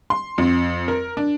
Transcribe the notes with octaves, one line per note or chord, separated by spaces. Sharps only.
C6
F2
A#4
D4